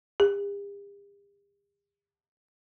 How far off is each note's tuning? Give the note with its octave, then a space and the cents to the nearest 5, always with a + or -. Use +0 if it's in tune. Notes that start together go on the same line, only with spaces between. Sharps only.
G4 +45